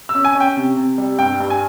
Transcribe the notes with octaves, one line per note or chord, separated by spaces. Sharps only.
E6
C#4
G#5
C#4
G5
C3
C3
G3
G2 G5
G2
G#5